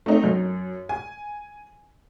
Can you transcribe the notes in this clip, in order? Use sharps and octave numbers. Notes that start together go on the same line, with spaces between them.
A3 C4 D#4
F#2
G#5